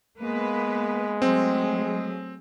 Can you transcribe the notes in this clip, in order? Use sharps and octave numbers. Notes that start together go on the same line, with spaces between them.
G#3 A#3 B3 B4
F#3 A3 C4 G#4